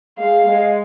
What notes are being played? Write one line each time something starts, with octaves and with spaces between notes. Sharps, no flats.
G#3 F5
G#3